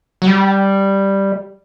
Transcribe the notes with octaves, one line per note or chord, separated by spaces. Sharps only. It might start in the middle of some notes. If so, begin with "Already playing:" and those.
F#3
G3